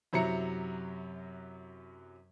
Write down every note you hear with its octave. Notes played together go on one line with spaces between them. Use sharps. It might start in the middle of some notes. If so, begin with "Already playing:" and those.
F#2 C3 F#3 E4 A#5 C#7